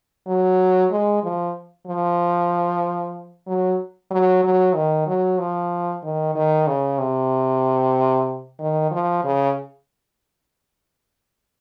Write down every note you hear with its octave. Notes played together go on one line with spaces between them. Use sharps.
F#3
G#3
F3
F3
F#3
F#3
F#3
D#3
F#3
F3
D#3
D#3
C#3
C3
D#3
F3
C#3